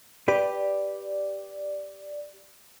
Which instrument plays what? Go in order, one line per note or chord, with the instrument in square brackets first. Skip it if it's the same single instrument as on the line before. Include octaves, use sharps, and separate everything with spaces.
[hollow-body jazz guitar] G4 B4 [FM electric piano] D5